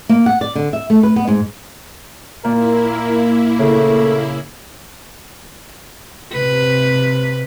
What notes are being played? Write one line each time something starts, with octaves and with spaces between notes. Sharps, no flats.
A#3
F#5
D5
D3
E5
A3
B4
B3
G#2
A#2 A#3 E4 A#4
C#3 A3
C3 B4